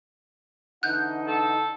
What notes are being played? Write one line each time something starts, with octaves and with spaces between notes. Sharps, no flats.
D3 E3 D#4 F#5 F#6 G6
A4